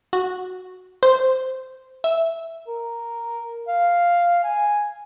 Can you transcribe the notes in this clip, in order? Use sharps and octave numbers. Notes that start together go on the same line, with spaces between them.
F#4
C5
E5
A#4
F5
G#5